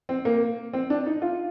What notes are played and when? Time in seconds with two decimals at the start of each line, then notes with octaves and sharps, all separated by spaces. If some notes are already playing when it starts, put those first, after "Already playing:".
0.09 C4
0.25 A#3
0.73 C4
0.90 D4
1.06 D#4
1.22 F4